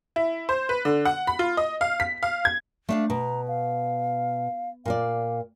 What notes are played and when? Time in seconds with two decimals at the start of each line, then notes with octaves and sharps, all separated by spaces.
0.16 E4
0.49 C5
0.69 B4
0.85 D3
1.05 F#5
1.27 B5
1.39 F4
1.57 D#5
1.81 F5
2.00 B6
2.23 F5
2.45 G#6
2.89 A3 D4 F5
3.10 B2 A#5
3.48 F5
4.85 A#2 F4 D5 F5